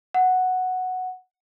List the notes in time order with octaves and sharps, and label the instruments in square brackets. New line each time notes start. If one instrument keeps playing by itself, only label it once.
[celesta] F#5